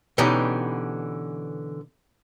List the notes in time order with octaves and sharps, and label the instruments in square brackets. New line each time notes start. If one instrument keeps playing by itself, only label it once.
[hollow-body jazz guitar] B2 D3 E3 C#4 D#4 G4